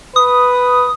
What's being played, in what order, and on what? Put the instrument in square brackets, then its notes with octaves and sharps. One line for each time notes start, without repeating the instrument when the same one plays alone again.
[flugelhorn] B4 [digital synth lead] D#6